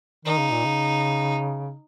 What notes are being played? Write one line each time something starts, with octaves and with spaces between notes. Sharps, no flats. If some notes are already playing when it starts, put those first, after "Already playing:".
D#3 D#4
C#3
A#2
C#3